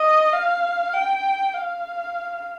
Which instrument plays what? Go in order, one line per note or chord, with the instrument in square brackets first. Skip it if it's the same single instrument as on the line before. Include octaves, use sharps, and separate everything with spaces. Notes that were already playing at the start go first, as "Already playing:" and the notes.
Already playing: [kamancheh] D#5
F5
G5
F5